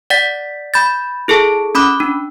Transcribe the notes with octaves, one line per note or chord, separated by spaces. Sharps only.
D5 F#5 A6 B6
B5 G6 A6
E4 G#4 A4 A5
C#4 B5 D6 F#6
D4